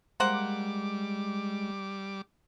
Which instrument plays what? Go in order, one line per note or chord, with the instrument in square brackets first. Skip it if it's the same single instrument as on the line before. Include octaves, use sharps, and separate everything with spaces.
[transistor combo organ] G3 D6 [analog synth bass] G#3 [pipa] A#3 C5 F#5